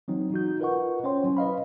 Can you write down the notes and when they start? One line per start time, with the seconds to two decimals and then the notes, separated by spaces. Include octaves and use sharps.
0.08 E3 F#3 C4 D#4
0.32 D#4 F#4 G6
0.60 F4 A#4 B4 D#5 F#5 C#6
1.04 C#4 C5 C#5 G5 C6
1.24 F#3 C#4 E4
1.37 B4 D#5 F5 B5